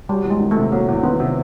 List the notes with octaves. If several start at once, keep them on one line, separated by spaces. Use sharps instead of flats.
F#3 G3
E2
G#3
D#3
A3
C3
F#3 A#3
E2
D#3 B3
C3